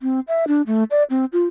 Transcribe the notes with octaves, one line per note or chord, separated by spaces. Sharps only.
C4
E5
D4
A3
D5
C4
F4